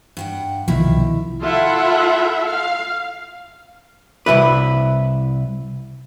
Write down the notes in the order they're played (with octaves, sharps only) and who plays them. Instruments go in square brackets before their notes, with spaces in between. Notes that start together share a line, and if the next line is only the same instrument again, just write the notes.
[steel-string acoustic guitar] G2 F#5 G5
[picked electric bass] C2 B2 F3 [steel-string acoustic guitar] D#3 E4
[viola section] E4 F4 A4 E5 F#5
F5
[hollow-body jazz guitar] C2 G2 E4 B4